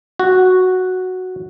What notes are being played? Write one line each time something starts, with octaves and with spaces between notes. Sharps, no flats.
F#4